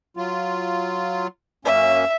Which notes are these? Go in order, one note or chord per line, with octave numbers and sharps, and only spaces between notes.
F#3 F4
F#2 A#3 C#4 E5